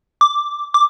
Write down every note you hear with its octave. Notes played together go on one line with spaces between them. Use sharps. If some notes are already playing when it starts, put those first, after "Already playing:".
D6
D6